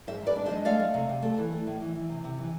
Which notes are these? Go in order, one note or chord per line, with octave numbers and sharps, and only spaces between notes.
G#2 C5 E5
G#2 B4 D5
D4
C5 E5
G#3
A3 D5 F5
A3
C3
C3
A3
E3
A3
A2
E3
E3
C3
C3
E3